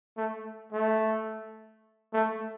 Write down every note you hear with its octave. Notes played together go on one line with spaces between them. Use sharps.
A3
A3
A3